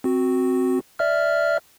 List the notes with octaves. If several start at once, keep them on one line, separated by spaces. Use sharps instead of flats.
C4 F#4
D5 E5 F6